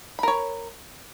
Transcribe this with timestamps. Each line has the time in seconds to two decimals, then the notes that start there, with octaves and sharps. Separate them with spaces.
0.19 B5
0.23 A#4
0.28 C#5